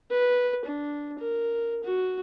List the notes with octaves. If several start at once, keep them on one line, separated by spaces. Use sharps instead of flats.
B4
D4
A#4
F#4